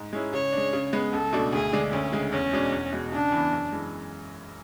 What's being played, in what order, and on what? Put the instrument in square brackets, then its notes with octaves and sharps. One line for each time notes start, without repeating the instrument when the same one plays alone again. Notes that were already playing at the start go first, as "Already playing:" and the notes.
Already playing: [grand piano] G#2
G#3 C#4 E4
[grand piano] C#3 [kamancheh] C#5
[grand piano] G#3 D4
C#3
G#3 B3
[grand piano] C#2 [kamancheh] A4
[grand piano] B2 A3 D4
[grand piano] D2 [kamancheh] G#4
[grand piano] D3 G#3 D4
[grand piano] D2 [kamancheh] C#4
[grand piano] C#3 G#3
[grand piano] E2 [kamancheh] C#4
[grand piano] B2 G#3 D4
E2
B2 G#3
[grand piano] C#3 [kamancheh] D4
[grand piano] E3 B3
F#2
E3 G#3